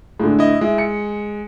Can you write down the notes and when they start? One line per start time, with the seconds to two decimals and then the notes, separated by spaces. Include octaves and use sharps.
0.19 A2 D3 G#3
0.39 E4 D#5
0.61 G#3 E4
0.78 C#7